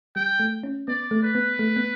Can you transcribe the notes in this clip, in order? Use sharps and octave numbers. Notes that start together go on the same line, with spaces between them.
G3 G5
A3
C#4
B3 D5
A3
B4
B3
A3
B3